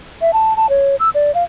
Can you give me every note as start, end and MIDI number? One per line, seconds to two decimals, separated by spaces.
0.21 0.33 76
0.33 0.56 81
0.56 0.69 81
0.69 0.95 73
0.99 1.09 88
1.14 1.34 74
1.34 1.43 77